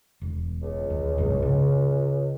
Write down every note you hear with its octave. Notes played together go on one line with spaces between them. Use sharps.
E1
C#2
D#2
F#1 C2 G#2
C#3